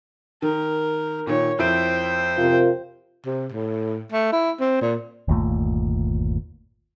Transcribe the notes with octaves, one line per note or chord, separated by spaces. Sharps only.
D#3 A#4
A#2 D#3 C#5
F2 E4 C5 G5 D7
C3 F4 A#4
C3
A2
A3
E4
C4
A#2
G1 D#2 A#2 A3